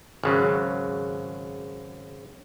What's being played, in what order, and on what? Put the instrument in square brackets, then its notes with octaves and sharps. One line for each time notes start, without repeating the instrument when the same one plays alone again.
[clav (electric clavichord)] G#1 C#3 F#3